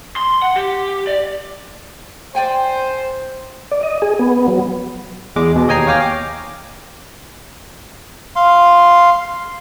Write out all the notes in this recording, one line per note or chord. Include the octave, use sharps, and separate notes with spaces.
C6
F#5
G4
D5
C5 D5 G5 G#5
D5
D#5
G#4
B3
F#3
E2 G#3 D6
B2
D#2 D#5 G5 G#5 A#5 C7
C#5 F5 G5 D6 F6 A#6
D6
F5 C6